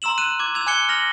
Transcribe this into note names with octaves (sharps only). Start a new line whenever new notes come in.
A#5 C6 E6 E7 F#7
F#6 D#7 E7
D6 G#6
E6 G#6 F7
G#5 D6 F#6 G#6 C#7 G7
F6 A#6 F7 F#7